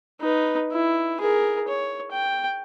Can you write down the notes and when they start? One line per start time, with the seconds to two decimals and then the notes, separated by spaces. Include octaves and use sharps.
0.21 D#4 B4
0.72 E4
1.21 G#4 A#4
1.68 C#5
2.11 G5